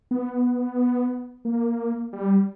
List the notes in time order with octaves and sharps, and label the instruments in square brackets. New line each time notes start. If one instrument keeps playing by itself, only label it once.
[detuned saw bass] B3
A#3
G3